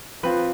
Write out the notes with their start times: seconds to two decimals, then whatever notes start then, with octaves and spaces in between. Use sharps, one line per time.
0.23 F3 C4 F4 B4